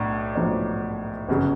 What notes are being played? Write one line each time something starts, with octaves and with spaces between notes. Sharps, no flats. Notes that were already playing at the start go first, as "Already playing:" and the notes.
Already playing: B1 A2 D4
B1 A2 F3 A#3 D4
G1 F#2 C#3